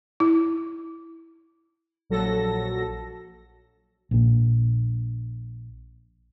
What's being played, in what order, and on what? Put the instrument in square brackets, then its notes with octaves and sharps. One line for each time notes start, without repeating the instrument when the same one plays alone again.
[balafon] E4
[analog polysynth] A#1 F#3 A4 A#6
[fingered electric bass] A#1 A#2